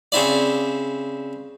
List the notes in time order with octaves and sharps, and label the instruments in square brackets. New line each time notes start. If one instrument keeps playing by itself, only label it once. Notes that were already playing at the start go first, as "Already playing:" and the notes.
[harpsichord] C#3 C4 E4 D5